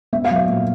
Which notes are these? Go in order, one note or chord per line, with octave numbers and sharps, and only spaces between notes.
B3 E5
F5
F#3
E5
A#2